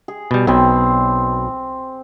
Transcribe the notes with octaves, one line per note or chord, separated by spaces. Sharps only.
G#4
B2 G3
B1 B2 C4